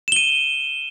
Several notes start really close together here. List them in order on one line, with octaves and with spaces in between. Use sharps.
E7 G7 D#7